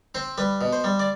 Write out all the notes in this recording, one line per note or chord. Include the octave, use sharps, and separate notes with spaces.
C4 C5
G3 B4
B2
C5
G3
D5